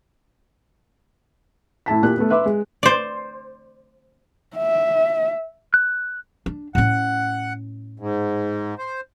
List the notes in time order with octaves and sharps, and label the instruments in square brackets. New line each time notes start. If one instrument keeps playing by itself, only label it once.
[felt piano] A2 E4 A5 B6
A#2 G4 F#6
A3 B3
B4 E5 C6 D6
G#3
[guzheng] C5 D5
[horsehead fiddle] E5
[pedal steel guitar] F#6
[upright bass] D4
[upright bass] A2 C#4 [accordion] F#5
[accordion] G#2
C5